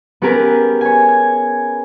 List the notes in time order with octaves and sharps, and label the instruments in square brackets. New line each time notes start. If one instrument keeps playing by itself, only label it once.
[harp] B3 C#4 G4 G#4 A#4 B4
C#5 G#5
G#6